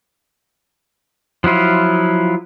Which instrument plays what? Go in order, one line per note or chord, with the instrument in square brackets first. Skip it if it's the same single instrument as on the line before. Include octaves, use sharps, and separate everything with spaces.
[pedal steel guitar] F3 F#3 E4 F4